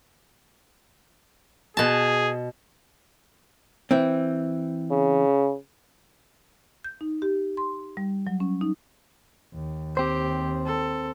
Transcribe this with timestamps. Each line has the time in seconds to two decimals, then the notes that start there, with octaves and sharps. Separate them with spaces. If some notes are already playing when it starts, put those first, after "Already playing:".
1.77 B2 G#4 A5
3.91 E3 C4
4.91 C#3
6.84 G6
7.01 D#4
7.22 G4
7.57 C6
7.97 G3
8.27 F#3
8.40 C#4
8.61 D#4
9.54 D#2
9.97 C4 G4 C5
10.66 A4